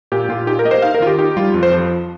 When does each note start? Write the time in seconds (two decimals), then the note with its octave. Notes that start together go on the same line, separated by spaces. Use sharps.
0.12 A#2 G4
0.29 A#2 F4
0.47 D#4 G4
0.59 A#4
0.65 A#3 D#5
0.71 C5
0.82 D#4 F5
0.95 A#4
1.00 D#3 F4
1.07 G4
1.19 D#4 G4
1.37 G3 F4
1.54 F2
1.63 C5
1.72 F3